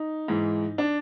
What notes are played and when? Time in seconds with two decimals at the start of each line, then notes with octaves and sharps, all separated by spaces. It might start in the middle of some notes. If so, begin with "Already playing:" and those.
Already playing: D#4
0.28 G#2 E3
0.78 D4